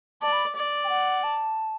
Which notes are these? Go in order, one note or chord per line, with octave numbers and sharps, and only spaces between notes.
D5 A5
B5
D5
G5
F#5
A5